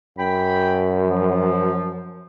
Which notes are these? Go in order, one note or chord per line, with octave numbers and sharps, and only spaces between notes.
F#2 G5 B5
F3